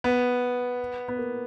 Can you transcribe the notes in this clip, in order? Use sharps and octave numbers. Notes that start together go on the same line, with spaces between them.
B3
B3
A#3